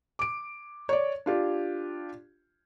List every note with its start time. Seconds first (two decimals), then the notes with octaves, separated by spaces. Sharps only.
0.19 D6 D7
0.89 C#5 D5
1.26 D4 F4 G4